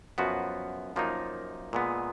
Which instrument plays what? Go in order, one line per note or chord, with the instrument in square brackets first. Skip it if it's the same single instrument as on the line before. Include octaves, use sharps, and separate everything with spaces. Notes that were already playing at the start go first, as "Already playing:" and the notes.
[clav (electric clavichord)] F#2 F3 B3 F#4
F#2 F3 A#3 D#4
A#2 G#3 B3